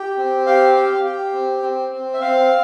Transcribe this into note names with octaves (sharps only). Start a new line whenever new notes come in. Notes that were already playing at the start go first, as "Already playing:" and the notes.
Already playing: G4
C4
G4 F5
G4
G4
C4
C4
C4
E5
C4 F5